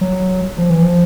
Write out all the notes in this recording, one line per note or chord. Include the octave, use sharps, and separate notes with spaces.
F#3
F3
E3
F3